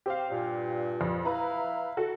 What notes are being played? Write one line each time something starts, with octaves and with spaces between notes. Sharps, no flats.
C4 G4 C5 F5
G2 A#2
F2
E4 B4 F5 A#5
F#4 A4